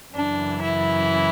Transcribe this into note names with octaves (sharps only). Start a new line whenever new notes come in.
F#2 C#3 E3 D4
E4